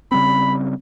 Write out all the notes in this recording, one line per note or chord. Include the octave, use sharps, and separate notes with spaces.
C#3 G3 C4 B5